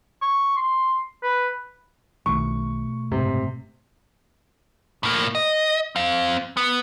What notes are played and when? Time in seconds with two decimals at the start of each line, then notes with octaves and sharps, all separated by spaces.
0.22 C#6
0.56 C6
1.23 B4
2.26 B1 B2 D#3 F3 A3 C#6
3.12 F#1 G#2 C3
5.03 A2 A#3
5.35 D#5
5.96 C4 F5
6.57 B3